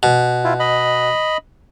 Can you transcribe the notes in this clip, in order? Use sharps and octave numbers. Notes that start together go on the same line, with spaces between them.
B2
E4 F4
D#5 B5